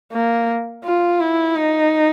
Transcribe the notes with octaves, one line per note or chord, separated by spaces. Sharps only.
A#3
F4
E4
D#4